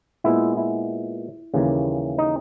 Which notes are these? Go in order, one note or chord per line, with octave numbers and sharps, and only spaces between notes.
A#2 G#3 B3 E4
E4
D#2 C#3 E3 G3 A#3
D#4